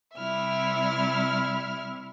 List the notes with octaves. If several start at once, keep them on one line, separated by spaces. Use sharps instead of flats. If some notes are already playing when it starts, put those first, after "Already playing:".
C3 G3 E4 E5 F6